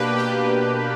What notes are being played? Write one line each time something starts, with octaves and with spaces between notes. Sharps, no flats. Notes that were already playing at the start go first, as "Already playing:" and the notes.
Already playing: B2 A#3 D4 G4 B4
G4